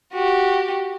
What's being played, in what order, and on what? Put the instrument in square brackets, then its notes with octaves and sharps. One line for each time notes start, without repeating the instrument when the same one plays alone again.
[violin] F#4 G4